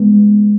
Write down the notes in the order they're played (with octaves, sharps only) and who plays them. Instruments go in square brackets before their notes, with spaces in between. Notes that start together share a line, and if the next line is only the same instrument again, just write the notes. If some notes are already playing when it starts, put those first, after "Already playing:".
Already playing: [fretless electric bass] G#3 B3